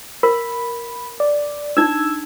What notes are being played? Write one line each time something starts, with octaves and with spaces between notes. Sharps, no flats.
A#4 B5
D5
D4 D#4 E6 G#6